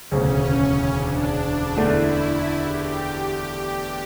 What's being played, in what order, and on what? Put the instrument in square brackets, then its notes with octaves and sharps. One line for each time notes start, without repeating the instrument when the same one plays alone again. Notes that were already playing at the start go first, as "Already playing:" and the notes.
[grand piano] E1 D2 C#3 [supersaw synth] C#4
[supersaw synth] C#4
D4
D4
[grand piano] E2 D3 A3 D4 [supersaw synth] E4
[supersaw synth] G4